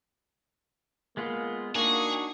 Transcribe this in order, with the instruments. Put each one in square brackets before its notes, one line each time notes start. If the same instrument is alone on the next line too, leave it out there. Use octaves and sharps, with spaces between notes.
[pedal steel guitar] G#3 B3 F4 [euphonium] A#3
[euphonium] A#3 [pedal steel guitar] D4 D#4 F#4 [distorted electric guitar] G#4